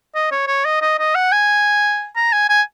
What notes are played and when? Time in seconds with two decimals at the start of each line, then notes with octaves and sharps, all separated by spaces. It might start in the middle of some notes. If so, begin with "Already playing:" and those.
0.15 D#5
0.31 C#5
0.47 C#5
0.65 D#5
0.82 D#5
0.99 D#5
1.15 F#5
1.32 G#5
2.16 A#5
2.33 G#5
2.49 G#5